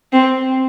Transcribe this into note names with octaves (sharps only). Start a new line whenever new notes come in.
C4